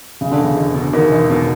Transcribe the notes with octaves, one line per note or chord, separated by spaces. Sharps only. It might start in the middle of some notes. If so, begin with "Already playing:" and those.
E1 C#3
D3
E2
C#3
E1
B2
E2 D#3
E1
B2